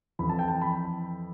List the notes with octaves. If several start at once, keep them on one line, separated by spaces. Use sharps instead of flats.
F2 E3 B5
A5
G5
A5
B5